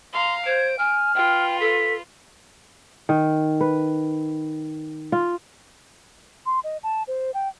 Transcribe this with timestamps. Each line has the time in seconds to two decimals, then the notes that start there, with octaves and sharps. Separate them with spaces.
0.13 F5 A#5 C6
0.46 C5 G#6 D7
0.79 G#5 F6
1.15 F4 B4 G5
1.60 A4 B6
3.09 D#3
3.61 B4
5.12 F4
6.46 C6
6.64 D#5
6.83 A5
7.07 C5
7.34 G5